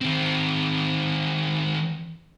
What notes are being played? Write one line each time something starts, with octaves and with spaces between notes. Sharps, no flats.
D#3 C4